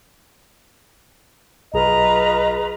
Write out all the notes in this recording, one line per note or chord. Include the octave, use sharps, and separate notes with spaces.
B1 F4 G#4 B4 D#5 A#5